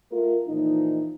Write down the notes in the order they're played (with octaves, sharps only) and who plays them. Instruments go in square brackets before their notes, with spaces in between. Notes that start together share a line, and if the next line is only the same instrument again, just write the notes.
[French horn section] A3 F4 A#4
A#2 E3 F3 D#4